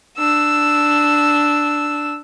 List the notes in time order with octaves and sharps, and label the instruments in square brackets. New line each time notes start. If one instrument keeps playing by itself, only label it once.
[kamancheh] D4 E6